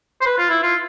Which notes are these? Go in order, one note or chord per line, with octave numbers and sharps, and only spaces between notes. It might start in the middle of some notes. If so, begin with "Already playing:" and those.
C5
B4
F4
E4
F4